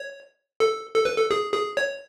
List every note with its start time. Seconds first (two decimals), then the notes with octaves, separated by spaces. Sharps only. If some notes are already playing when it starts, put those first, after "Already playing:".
Already playing: C#5
0.60 A4
0.95 A4
1.05 B4
1.16 A4
1.31 G#4
1.53 G#4
1.77 C#5